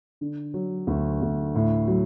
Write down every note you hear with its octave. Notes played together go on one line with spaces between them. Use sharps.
D3
F#3
D2
D2
A2
F#3